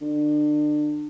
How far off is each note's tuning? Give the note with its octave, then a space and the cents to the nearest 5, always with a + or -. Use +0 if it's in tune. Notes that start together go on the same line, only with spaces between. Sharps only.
D3 +30